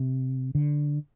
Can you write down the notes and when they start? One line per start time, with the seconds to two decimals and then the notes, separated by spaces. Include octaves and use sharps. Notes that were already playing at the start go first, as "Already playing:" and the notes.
Already playing: C3
0.55 D3